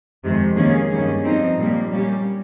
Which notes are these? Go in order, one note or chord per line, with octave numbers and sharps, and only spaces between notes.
F2 C3 D#3 G#3
D#2 D#3 A#3 C#4 G#4
G2 D#3 G3 C#4
F3 C4 D#4
A#2 G3 A#3
G3 A#3 C#4 G4